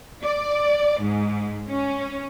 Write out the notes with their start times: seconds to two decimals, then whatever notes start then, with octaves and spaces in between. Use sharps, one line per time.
0.24 D5
1.00 G#2
1.69 C#4